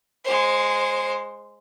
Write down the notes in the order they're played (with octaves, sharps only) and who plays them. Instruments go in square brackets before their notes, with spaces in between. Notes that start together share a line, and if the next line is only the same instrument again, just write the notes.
[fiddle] G#3 C5